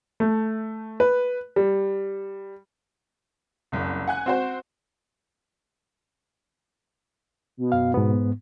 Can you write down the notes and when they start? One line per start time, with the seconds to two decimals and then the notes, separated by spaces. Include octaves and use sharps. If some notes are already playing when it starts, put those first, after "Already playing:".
0.20 A3
1.00 B4
1.56 G3
3.72 F#1 C2
4.07 F#5 G#5 F#6
4.26 C4 F#4 C5
7.57 B2
7.72 F#2 F5
7.94 G#2 B3